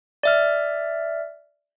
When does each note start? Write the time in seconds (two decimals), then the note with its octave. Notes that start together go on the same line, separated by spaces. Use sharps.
0.23 D5 E5 F6